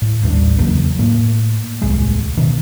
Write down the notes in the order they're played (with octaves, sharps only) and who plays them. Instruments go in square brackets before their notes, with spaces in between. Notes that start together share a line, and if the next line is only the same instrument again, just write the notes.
[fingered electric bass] A2
A1 D#2 G3 D4
E2 C#3 F#3 A#3
A2 A#3
D#1 C2 A2 G#3
B2 D#3